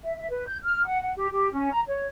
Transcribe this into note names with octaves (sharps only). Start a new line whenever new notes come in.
E5
E5
B4
G6
F6
F#5
F#5
G4
G4
C#4
A#5
C#5